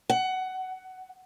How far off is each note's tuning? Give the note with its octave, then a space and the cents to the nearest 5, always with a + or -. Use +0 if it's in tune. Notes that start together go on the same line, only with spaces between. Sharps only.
F#5 +15